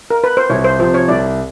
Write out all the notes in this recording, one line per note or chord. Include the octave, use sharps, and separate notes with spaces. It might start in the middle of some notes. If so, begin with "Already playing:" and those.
A#4
B4
C5
C2 C#5
C5
C3 F3 C5
C#5
C2 D5